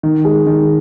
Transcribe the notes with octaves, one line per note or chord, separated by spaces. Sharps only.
D#3
G#3
D#3